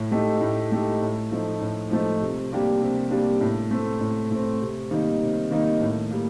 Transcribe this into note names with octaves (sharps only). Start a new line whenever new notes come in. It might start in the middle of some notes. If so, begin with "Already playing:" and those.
Already playing: A2
A3 D#4 G4
A2
A3 D#4 G4
A2
F3 A3 D#4
A2
F3 A3 D#4
C3
G3 A#3 D4 G4
C3
G3 A#3 D4 G4
A2
A3 C4
A2
A3 C4
C3
D#3 G3 A#3 D#4
C3
D#3 G3 A#3 D#4
A2
G3 A#3